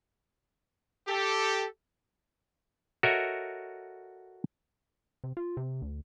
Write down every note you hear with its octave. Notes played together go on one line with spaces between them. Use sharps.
G4 A4
F#4 A4 A#4 C#5 D#5 E5
C3
F4
C3
D2